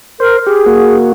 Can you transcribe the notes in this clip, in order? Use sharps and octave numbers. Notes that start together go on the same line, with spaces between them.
A#4 C5
G4 G#4
A#3 F#4